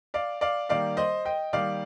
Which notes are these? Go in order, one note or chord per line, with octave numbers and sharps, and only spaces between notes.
D5 F5
D5 F5
D#3 G3 A#3 D5 F5
C5 D#5
D#5 G5
D#3 G3 A#3 D5 F5